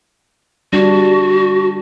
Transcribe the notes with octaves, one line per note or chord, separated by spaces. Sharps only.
G3 D4 F#4